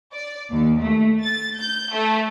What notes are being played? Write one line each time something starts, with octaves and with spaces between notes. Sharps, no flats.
D5
D#2
A3
A6
G6
A3